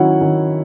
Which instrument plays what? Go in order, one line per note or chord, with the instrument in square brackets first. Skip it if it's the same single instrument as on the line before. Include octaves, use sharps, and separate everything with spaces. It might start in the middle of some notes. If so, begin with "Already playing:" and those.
Already playing: [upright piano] D#3 F#3 C#4 E4 F#5
D#3